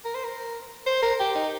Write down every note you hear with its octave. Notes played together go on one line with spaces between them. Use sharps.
A#4
C5
A#4
C5
A#4
G4
D#4